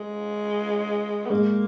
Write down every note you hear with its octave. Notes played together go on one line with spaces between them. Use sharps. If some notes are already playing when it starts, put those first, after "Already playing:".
Already playing: G#3
B3
G#3 A#3